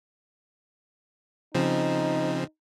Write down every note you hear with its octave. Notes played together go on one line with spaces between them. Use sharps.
C#3 F3 C4 D#4